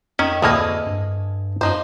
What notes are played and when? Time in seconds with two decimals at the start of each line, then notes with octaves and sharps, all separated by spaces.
0.19 F2 D#3 C#4
0.42 D2 A2 A#3 G#4 A4 D#5
0.86 G2
1.61 F#2 F3 D#4 C5